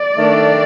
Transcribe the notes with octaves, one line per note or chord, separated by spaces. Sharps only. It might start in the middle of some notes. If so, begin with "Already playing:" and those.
Already playing: D5
D#3 A3 D4